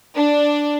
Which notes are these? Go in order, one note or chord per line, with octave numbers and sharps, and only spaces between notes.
D4